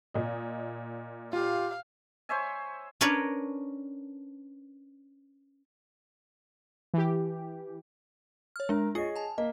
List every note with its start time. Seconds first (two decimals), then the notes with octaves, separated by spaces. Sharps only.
0.14 A#2 D#5
1.33 F4 G4 F5
2.29 C5 C#5 E5 G#5
3.01 C#4 D4 A#4 B4 C#5 D5
6.94 E3 G4
8.56 C#5 F6
8.69 G#3 D4 A#4
8.95 F4 G#4 C#5 D#5 C7
9.16 G#5 A5
9.38 A#3 D#5